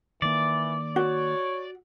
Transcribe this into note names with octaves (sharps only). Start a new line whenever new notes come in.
D#3 E3 A#3 D5
F#4 C#5